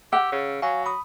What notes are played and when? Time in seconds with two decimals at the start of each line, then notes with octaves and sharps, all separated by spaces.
0.13 G4 F#5 E6
0.32 C#3
0.62 F#3 F5 G#5
0.86 B5 D#6